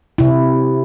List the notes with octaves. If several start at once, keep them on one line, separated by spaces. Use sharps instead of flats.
C3 E4